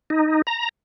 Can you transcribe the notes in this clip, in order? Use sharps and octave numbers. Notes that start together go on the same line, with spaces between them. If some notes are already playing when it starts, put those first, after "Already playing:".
D#4
A#5